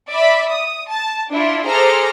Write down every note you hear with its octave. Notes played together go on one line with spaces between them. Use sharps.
D5 E5 B5
D#6
A5
D4 E4 F4
G#4 A4 C5 A#5 D6 F6